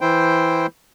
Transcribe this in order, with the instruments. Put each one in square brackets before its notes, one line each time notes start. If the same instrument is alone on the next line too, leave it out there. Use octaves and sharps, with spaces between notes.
[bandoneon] E3 E4 C5 G5